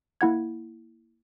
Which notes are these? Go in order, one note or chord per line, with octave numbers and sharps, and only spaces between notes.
A#3 E4 F#5 G#6